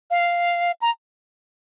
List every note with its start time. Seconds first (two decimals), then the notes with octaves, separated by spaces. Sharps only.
0.11 F5
0.82 A#5